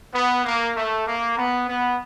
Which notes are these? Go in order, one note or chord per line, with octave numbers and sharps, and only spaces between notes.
B3
A#3
A3
A#3
B3
B3